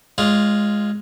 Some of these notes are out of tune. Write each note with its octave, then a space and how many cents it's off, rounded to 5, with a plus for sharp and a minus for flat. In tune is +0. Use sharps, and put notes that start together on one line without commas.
G#3 +0 F4 +0 C#5 +40